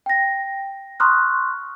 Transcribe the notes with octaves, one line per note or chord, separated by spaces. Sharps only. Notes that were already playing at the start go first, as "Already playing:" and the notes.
G5 A#6
A#5 C6 C#6 D#6 F6 F#6